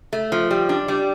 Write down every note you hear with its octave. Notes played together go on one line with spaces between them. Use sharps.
A3
F3
G3
D4
G3